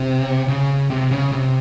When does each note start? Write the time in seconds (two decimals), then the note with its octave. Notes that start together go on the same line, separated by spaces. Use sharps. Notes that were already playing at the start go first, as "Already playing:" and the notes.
Already playing: C3
0.48 C#3
0.90 C3
1.11 C#3
1.32 C3